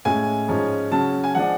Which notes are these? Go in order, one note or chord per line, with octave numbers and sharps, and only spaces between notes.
A2 G#3 C#4 G#5
G#2 F3 G#3 C#4
C#3 F#3 C#4 A5
G#5
F3 G#3 D4 F#5